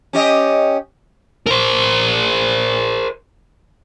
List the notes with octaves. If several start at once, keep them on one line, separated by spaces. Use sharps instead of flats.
C#4 G4 D#5
A#4 C5